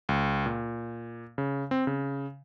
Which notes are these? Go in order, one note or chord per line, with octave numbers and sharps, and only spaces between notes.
C#2
A#2
C#3
C4
C#3